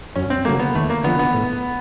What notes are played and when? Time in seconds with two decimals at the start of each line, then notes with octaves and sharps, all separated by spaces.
0.16 F#2 C#4
0.30 C4
0.45 C#3 F#3 A3 A#3
0.59 B3
0.74 D#2 A3
0.90 A#3
1.03 D3 F3 B3
1.19 B3
1.34 A2